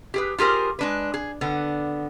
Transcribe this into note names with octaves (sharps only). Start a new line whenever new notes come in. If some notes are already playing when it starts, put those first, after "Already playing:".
G4 G#4 B4
F4 G4 G#4 A#4 C5
G#3 D4 B4
G#4
D3 B3